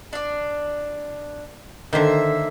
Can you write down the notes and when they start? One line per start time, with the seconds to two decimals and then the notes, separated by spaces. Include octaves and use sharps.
0.13 D4 D5
1.93 D3 D#3 A#3 C5 E5